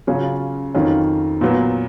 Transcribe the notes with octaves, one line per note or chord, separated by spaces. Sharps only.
C#3 F#3 C#4 F4
F2 D#3 F#3 C#4 F4
A#2 F#3 B3